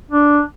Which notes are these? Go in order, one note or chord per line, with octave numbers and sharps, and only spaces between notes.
D4